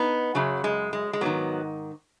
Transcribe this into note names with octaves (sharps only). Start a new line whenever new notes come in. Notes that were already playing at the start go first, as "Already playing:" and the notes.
Already playing: B3 D#4
F#2 C#3 F#3
G#3
G#3
G#3
G#2 D#3 F#3 B3